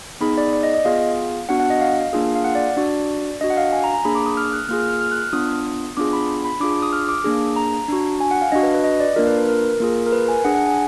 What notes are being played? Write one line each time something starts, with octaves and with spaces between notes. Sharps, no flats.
B3 D#4 G#4 B5
D5
D5
D#5
D#5
B3 F4 G#4 F5
B3 D4 F#4 F#5
F#5
D#5
F5
A#3 D4 F4 G#4
F5
F#5
D5
D4 F#4 D5
D4 F#4 D#5
F#5
F5
G#5
A#5
A#5
A#3 D4 G#4 B5
D6
D#6
F6
F#6
A#3 F4 G#4 F6
F6
F6
F6
F#6
F6
B3 D4 F4 D#6
B3 D4 F4 G#4 D6
B5
B5
D4 F4 G#4 D6
D6
D#6
F6
D6
A#3 D4 G#4
A#5
D4 F#4
G#5
F#5
F5
D4 F#4 D#5
B4
B4
D#5
D5
A#3 D4 F4 A#4
B4
B4
A#4
A#3 F4 G#4
A#4
B4
G#5
D4 G#4 F#5
F#5
G#5